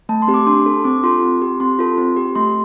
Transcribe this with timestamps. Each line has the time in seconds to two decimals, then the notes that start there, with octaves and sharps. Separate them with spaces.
0.09 A3 A5
0.22 C6
0.28 C4 G4
0.34 D6
0.47 D4 C6
0.66 A4
0.84 C4 D6
1.03 F4 A4 C6
1.22 C4
1.42 G4
1.60 C4 C6
1.79 F4 A4
1.98 C4
2.16 G4
2.35 A3 C6